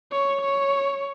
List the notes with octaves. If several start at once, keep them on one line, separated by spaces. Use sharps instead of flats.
C#5
C#5